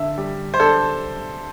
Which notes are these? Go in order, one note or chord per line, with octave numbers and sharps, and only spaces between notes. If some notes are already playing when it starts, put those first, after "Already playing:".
Already playing: D3 E5
G3
C5
D4 A4